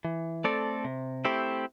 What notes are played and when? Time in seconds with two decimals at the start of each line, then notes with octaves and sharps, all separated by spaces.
0.05 E3
0.44 A3 C4 A4 D5
0.85 C3
1.25 A3 C4 E4 G4